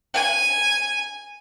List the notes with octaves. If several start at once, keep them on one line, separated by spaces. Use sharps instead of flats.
G#5